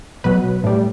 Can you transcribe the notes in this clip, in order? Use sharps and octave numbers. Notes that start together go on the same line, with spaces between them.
B2 F#3 B4
A2 G3